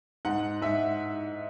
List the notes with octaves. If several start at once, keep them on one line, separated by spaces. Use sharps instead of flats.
G#2 F#5
G#2 E5